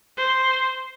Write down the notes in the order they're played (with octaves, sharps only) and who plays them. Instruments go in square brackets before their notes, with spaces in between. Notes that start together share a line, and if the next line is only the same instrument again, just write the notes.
[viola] C5